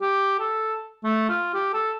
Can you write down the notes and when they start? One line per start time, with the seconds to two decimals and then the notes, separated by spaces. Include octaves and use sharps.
0.02 G4
0.40 A4
1.04 A3
1.29 F4
1.54 G4
1.73 A4